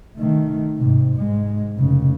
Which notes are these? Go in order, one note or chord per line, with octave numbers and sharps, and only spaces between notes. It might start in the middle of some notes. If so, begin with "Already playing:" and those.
D#3 A3
G#2 C3
G#2 G#3
F1 C#3